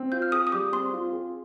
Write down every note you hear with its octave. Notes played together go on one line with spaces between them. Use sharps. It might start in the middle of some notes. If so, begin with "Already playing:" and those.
Already playing: C4
F4 G6
F6
G#4 D#6
D#6
G3 D6
C4 C6
F4
G#4